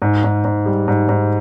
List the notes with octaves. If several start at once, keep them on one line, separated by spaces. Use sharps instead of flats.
G#2
G#2
G#2
G3
G#2
G#2